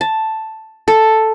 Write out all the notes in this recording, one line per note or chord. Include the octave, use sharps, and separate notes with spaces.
A5
A4